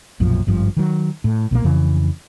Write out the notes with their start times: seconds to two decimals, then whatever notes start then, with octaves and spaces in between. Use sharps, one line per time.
0.20 B1 F#2 A#2 F3
0.47 G#1 G2 F3
0.77 D#3 F#3
1.24 A2
1.51 B1 A#2 D#3 A#3
1.64 F2 C#3 E3